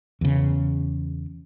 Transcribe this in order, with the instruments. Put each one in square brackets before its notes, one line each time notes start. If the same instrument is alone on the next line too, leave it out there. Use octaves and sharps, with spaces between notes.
[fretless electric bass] E2 C#3